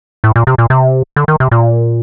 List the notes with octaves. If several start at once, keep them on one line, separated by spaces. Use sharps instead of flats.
A2
A#2
C3
A#2
C3
D3
D#3
C3
A#2